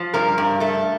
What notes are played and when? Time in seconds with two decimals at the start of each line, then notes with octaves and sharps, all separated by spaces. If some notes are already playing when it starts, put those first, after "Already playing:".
Already playing: F3
0.14 G2 A#4
0.38 G2
0.60 A3 A4